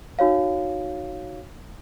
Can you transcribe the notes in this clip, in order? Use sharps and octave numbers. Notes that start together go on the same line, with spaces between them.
D#4 F#4 C#5 F5